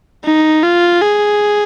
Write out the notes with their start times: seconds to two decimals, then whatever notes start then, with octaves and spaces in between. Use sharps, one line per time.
0.24 D#4
0.63 F4
1.01 G#4